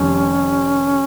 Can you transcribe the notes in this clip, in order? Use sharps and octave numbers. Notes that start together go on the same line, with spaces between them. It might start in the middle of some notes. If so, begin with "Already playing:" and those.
Already playing: F1 F2 D#3 G3 C#4